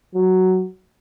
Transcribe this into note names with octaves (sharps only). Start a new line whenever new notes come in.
F#3